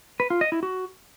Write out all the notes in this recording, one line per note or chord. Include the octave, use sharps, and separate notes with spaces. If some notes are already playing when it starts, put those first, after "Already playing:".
B4
F4
D#5
E4
F#4